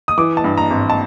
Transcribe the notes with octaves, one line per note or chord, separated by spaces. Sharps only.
D#6
E3 D6
A5
G2
A#5
G#1
A5